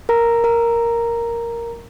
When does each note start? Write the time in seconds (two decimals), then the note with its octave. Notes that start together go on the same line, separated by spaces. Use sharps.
0.09 A#4 A#5
0.44 A#4 A#5